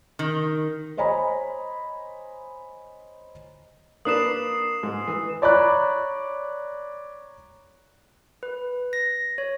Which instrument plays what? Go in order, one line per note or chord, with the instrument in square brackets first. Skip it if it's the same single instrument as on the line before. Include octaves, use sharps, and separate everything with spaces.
[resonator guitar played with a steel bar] D#3
[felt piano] C5 C#5 D#5 G#5 A#5 B5
[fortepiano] A#3 D4 B4 [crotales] D#6 C7 E7
[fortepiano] G#2
E3
[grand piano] C#5 D5 A#5 B5 D6 F#6
[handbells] B4
A#6
C#5